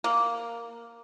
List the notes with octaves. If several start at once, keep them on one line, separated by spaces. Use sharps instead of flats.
A#3